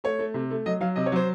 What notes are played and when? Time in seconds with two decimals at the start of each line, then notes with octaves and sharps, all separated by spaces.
0.04 A3 C#5
0.19 A3
0.34 C3
0.50 A3
0.66 F#3 D#5
0.81 F#3 F5
0.96 C3 D#5
1.06 C#5
1.12 F#3 C5